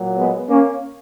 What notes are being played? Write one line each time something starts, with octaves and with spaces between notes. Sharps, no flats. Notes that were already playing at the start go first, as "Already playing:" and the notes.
Already playing: A#2 F#3
G#3 B3
A#3 C#4